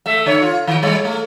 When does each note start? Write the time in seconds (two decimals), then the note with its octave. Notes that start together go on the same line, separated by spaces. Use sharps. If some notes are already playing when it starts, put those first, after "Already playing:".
0.06 A3 E5
0.26 D3 C#5
0.42 F4
0.67 D#3
0.83 G3 G#3 C#5
1.05 A3